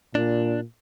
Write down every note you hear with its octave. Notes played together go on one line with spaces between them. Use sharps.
A#2 D4